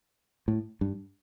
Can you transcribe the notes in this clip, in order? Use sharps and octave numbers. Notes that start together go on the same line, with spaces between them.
A2
G2